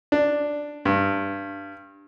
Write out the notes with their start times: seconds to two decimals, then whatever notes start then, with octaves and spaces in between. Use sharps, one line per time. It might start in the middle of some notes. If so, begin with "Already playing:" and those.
0.12 D4
0.85 G2